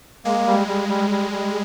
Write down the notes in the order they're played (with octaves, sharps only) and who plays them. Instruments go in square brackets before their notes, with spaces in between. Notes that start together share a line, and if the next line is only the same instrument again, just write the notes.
[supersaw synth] G#3 [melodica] A#3
[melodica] G3
G3
G3
G3
G3